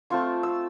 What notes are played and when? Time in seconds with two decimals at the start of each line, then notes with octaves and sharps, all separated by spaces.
0.10 A3 C4 F4 C#6
0.43 E6